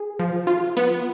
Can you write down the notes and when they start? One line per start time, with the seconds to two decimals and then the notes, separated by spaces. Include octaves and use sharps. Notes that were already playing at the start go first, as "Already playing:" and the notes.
Already playing: G#4
0.19 F3
0.47 F4
0.77 B3